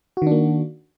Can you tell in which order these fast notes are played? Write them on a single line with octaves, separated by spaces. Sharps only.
F#4 D#3 D4 A#3